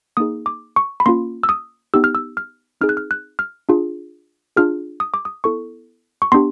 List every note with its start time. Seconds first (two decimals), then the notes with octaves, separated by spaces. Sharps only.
0.17 A#3 D#4 G#4 D#6
0.46 D6
0.76 C#6
1.00 B5
1.06 A#3 C#4 F4 C6
1.43 E6
1.49 D#6
1.94 B3 D#4 G4 E6
2.04 F6
2.15 E6
2.37 F6
2.81 C4 D#4 G#4 F6
2.89 F#6
2.97 F6
3.11 F#6
3.39 F6
3.69 D4 F4 G#4
4.56 D4 F4 G#4 F6
5.00 D#6
5.14 D6
5.25 D#6
5.44 B3 E4 A4 C#6
6.22 C#6
6.32 B3 D4 G4 C6